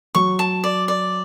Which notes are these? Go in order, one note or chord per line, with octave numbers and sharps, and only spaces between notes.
F#3 C#6
A5
D5
D5